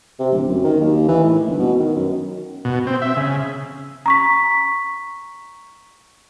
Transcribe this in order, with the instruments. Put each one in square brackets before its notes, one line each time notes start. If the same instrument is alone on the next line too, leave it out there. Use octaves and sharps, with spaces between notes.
[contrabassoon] C3
D1
F#2
D#3
D#2
E3
A2
G1
B2
D#3
F#2
[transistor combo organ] B2
C4
E5
C#3
[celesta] A#5 C#6 B6